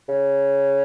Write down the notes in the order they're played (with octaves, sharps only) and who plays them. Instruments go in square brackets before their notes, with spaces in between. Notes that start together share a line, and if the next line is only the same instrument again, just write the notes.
[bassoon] C#3